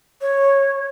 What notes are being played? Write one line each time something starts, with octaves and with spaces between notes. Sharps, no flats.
C#5